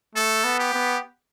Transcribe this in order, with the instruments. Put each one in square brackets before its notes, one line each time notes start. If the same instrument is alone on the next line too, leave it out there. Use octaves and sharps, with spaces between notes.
[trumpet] A3 [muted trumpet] A4
[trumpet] B3
[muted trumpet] G4
[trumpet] B3